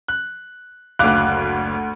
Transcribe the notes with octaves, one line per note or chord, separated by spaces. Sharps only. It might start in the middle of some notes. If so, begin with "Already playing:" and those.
F#6
F#1 D2 F5 D6 F#6